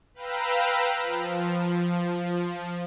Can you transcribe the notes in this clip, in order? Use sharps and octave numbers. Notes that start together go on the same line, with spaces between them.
B4 F5 G5 A#5 B5 E6
F3